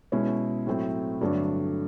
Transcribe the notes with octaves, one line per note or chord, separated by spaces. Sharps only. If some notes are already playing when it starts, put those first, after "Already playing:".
B2 G#3 C#4 E4
A2 F#3 A3 C4 E4
G2 D3 F#3 A3 D4